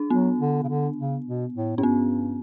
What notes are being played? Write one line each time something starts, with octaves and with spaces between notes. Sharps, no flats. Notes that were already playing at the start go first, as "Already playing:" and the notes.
Already playing: D4
F#3 B3
D3
C#3
D3
C#3
B2
A2
A2 C#4
G2 B3